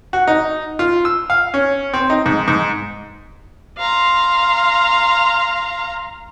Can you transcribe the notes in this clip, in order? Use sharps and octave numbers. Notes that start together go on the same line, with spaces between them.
F#4
D#4
F4
E6
F5
C#4
C4
D#4
G#2
G#2
F5 A#5 C6